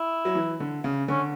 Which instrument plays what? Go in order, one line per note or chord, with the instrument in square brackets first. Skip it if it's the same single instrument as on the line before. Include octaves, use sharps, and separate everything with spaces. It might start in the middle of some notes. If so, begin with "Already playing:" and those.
Already playing: [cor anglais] E4
[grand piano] F#3
E3
D3
C#3
[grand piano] D3 [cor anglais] C#4